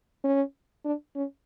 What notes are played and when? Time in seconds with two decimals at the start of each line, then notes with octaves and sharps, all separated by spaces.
0.24 C#4
0.85 D4
1.15 C#4